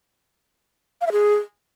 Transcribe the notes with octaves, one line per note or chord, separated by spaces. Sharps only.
F5
E5
G#4